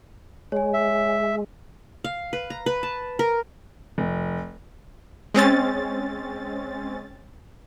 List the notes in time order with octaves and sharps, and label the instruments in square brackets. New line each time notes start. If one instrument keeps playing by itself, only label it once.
[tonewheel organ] G#3 [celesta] C#5 G#5
[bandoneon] E5
[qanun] F5
B4
A#5
B4
A5
A#4
[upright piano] F1
[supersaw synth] G#3 C4 C#4 A6